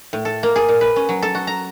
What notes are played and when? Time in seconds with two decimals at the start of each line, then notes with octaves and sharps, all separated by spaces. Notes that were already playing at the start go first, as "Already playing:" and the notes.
0.13 A2
0.25 A4
0.43 A#3
0.56 G#4
0.69 A#2
0.81 B4
0.96 C#4
1.09 F#3
1.22 A4
1.35 F#4
1.47 A#5